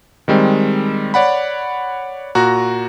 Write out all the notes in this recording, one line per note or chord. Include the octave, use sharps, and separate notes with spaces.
D#3 G3 G#3 C4
C#5 D5 F#5 B5
A#2 F#4 A#5 F#6